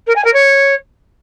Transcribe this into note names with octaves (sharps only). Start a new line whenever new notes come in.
A#4
G#5
A#4
C#5